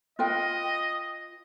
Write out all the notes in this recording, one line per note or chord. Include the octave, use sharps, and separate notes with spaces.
F4 B4 D#5 G5